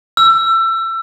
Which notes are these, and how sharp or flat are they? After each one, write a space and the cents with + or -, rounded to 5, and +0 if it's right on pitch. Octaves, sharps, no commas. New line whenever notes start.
E6 +25